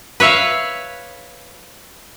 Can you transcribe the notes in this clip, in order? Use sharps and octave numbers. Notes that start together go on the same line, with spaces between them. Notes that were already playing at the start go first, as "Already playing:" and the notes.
B4 C#5 E5 F5